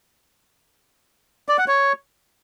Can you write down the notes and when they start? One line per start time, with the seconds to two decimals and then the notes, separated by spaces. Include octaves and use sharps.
1.49 D5
1.58 F#5
1.68 C#5